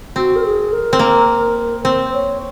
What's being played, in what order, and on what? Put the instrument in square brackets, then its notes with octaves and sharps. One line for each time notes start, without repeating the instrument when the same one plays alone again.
[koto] C4 [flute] F#4
[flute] A#4
G#4
A#4
[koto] C4
A#3
[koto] C4 [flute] C5
[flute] C#5